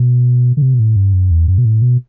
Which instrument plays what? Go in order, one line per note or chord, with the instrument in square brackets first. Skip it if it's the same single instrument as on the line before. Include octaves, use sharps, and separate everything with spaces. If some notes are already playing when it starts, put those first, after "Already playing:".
Already playing: [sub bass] B2
D3
C3
B2
A2
G2
F#2
E2
F#2
B2
A2
B2